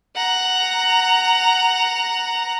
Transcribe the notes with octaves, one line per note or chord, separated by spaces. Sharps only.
F#5 A#5